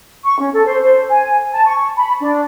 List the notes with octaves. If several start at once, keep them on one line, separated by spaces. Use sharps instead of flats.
C#6
C#4
A4
C5
C5
G#5
A5
C#6
B5
D4